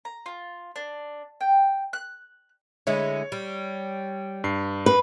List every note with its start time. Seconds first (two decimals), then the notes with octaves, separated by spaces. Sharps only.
0.05 A#5
0.26 F4
0.76 D4
1.41 G5
1.93 F#6
2.87 D3 G#3 E4 C#5
3.32 G3
4.44 G2 C7
4.86 B4